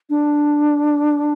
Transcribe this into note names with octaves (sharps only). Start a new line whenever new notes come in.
D4